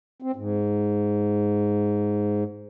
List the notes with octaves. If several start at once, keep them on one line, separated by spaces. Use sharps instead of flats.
C4
G#2